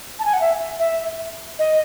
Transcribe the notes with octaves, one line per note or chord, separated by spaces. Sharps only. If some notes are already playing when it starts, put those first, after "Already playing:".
A5
G#5
F#5
E5
E5
D#5